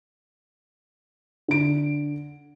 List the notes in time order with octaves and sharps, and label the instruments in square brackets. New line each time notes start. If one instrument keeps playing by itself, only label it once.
[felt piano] D3 D7